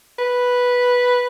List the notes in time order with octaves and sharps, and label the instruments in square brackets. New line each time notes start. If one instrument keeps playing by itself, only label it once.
[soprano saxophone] B4